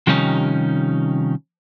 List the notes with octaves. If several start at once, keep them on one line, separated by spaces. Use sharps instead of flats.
C3 D#3 F3 G3 C#4 D#4